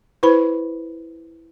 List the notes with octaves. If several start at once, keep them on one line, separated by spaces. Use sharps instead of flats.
E4 B4 C5 B5